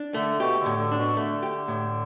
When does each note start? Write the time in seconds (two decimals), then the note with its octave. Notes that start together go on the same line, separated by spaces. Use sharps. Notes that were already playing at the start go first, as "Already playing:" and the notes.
Already playing: D4
0.14 D3 A3
0.40 B2 G4
0.60 D3
0.66 A2
0.78 D3
0.92 D4
0.98 B2
1.17 D3 A3
1.43 G4
1.68 A2